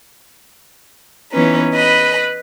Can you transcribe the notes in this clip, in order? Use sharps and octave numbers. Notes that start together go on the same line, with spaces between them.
E3 B3 C#4 D#4 B4
B4 D#5 B5